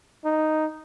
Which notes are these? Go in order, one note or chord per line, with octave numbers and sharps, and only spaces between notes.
D#4